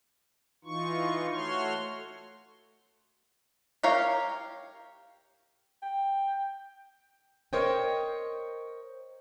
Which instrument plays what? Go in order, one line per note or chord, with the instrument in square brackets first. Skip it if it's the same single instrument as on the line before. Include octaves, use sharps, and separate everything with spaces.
[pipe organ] E3 D#4 F4 C#6
A3 F#4 C#5 C6 F6
[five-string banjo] G4 A#4 C#5 F5
[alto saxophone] G5
[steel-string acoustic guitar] A#4 C5 C#5 D#5 G5